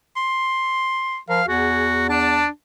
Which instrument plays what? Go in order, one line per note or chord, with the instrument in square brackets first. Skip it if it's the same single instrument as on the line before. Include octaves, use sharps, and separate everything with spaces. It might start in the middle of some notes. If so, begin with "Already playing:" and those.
[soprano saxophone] C6
[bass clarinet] F3 [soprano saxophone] A#4 [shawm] F5
[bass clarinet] E2 [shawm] F#4 [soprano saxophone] G#4
[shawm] D4 [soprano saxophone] A5